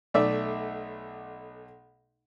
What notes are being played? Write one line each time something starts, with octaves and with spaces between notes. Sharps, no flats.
B1 A3 D5 E5